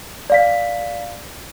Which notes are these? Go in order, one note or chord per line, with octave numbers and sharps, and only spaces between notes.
D5 F5 B6